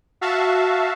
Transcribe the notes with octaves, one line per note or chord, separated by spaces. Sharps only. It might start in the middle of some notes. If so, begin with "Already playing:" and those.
F#4 E5 F5 A5